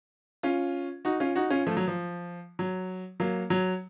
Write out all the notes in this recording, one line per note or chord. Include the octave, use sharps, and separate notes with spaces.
C#4 F4
D#4 F#4
C#4 F4
D#4 F#4
C#4 F4
F3 A3
F#3
F3
F#3
F#3 A#3
F#3